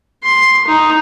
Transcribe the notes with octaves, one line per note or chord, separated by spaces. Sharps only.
C6
D#4